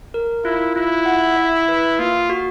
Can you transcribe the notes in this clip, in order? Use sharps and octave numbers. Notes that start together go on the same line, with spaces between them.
A#4
E4 F4
E4 F4
F#5
E5
B4
A#3 F4
F#4